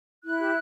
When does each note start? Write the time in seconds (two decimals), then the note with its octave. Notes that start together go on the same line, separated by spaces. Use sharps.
0.24 E4 F#6
0.39 G4